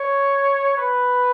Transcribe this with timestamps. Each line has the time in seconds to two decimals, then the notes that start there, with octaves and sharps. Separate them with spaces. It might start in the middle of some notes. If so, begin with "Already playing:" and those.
Already playing: C#5
0.77 B4